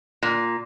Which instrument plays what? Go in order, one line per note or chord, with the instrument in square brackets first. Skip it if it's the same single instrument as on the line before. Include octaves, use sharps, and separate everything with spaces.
[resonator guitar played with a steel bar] A#2